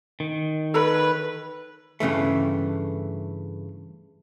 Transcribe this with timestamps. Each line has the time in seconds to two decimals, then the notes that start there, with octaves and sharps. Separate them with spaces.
0.20 D#3
0.74 A4 B4 C#5 B5
2.00 G2 C#3 E3 A3